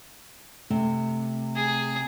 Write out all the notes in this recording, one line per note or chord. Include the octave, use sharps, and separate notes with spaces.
C3 A3
G#4